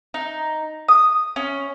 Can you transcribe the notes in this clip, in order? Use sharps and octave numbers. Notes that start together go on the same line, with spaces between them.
D#4
D#6
C#4